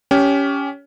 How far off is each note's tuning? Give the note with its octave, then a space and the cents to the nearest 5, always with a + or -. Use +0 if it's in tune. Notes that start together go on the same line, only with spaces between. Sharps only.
C#4 +15 G4 +0